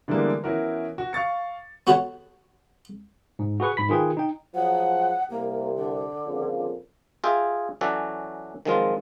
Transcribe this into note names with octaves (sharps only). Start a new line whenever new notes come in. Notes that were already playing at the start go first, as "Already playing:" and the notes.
D3 E3 G3 G#3 A#3 B3
E3 B3 C#4 E4 F#4 A#4
F#4
F5 C#6 A6 C#7
B3 F#4 A4 B4 C#5 F#5
G#2
F#4 G#4 B4 C#6
G#2 B5 B6
D#3 F4 G#4 B4 G5
D#4 G5
F3 F#3 G#3 F#5
C2 C3 A#3
D3
F2 A#2 C#3
F4 G#4 D#5 E5 G5 G#5
E3 F#3 C#4 F#4 A4 D5
D#3 F3 F#3 G#3 C4 F4